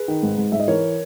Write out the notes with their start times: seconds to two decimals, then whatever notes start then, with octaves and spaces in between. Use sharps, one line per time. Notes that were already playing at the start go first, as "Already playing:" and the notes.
Already playing: G#4 B4
0.08 D#3
0.23 G#2
0.38 G#2
0.52 G#2 E5
0.60 D#5
0.68 E3 A#4 C#5